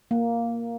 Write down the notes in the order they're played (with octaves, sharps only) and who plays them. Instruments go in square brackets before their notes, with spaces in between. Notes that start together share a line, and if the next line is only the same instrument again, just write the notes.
[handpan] A#3